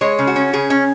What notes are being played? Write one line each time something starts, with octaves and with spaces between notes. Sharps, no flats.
G#3 C#5
C#3
F#4
C#4
C#3 G#4
C#4